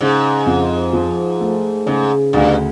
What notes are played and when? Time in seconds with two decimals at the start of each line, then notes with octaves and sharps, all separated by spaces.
0.01 G#2 C#3
0.46 F2
0.93 F3
1.40 A3
1.86 G#2 C#3
2.33 D2 G2